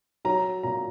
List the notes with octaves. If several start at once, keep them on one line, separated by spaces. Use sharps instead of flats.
F#3 A#5
A#2 A#5